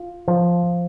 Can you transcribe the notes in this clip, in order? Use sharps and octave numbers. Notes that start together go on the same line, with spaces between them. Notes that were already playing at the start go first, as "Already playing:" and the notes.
Already playing: F4
F3